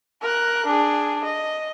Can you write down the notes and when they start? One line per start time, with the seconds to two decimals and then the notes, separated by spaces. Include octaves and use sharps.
0.22 A#4 F#6
0.66 D4 G#4
1.24 D#5